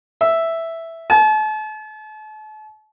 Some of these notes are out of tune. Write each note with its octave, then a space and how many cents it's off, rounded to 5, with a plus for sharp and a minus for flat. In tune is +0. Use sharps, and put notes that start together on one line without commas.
E5 +0
A5 -40